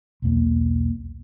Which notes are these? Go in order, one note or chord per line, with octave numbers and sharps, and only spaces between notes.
B1 E2 A#3